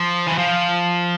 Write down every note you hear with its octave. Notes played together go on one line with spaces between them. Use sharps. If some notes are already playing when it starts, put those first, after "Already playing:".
Already playing: F3
E3
F3